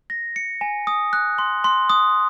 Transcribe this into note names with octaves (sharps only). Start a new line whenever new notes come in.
A#6
C#7
G#5
D#6
F#6
C6
C6
D#6